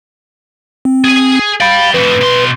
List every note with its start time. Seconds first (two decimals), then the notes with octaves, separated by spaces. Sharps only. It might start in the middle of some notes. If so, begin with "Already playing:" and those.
0.85 C4
1.04 G#4 G#5
1.60 D5 F5 G5 B5
1.94 F2 A2 B4
2.21 B2 C6